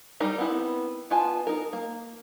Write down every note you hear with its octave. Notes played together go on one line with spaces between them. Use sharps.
G3 D#4 A#4 B5
B3 C4 E4 B5
B3 F4 G#5 A5
D#4 A#4
A#3